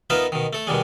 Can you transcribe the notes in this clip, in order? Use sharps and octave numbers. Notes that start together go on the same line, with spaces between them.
B3 D#4 F4 A#4 B4 E5
B2 D#3
A3 A4
B2 D#3 G3 G#3